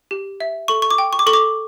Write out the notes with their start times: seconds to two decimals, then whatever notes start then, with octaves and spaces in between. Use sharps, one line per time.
0.11 G4
0.40 E5
0.68 A4 C#6
0.82 C#6
0.91 D6
0.98 G5
1.13 C#6
1.19 D6
1.27 A4 C#6
1.33 D6